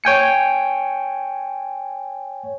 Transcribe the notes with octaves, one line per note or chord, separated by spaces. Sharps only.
C#5 G5 G#5 C#7